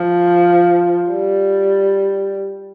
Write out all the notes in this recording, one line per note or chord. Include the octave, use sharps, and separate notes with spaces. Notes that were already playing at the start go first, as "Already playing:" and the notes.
Already playing: F3
G3